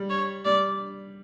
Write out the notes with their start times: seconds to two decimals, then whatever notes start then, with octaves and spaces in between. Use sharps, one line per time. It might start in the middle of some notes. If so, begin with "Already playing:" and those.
Already playing: G3
0.10 C#5
0.45 G3 D5